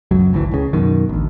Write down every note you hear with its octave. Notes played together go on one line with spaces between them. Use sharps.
C#2 F#2 F#3
G#1 D2 C#3 E3
C#2 C#3
F#2 B2 D#3
A1 D2